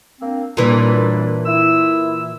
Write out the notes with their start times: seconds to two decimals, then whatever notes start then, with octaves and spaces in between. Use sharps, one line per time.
0.20 A#3 C4 D4
0.57 F#2 A#2 E3 G3 D4
1.46 E4 E6